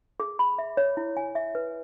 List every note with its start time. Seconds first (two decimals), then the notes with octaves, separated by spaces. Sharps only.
0.20 G#4
0.39 B5
0.58 E5
0.77 C#5
0.97 E4
1.17 G#5
1.35 E5
1.55 B4